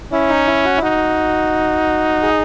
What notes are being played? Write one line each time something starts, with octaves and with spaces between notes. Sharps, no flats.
C#4 E4
D#4
E4
F#4
E4
D#4 F#4
G#4